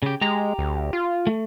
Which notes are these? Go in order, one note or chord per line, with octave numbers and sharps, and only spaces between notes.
C#3 G4
G#3 G4 A#5
D2
F4
A3